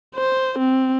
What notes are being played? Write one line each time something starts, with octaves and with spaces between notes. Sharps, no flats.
C5
C4